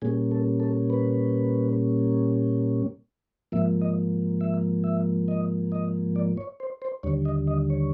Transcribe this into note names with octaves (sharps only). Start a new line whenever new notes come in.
A#2 G3 A#3 C#4 G#4
A4
A4
B4
G#2 F3 A#3 E5
D#5
E5
E5
D#5
D#5
D5
C#5
C5
C5
D#2 D3 G3 C#5
D#5
D#5
C#5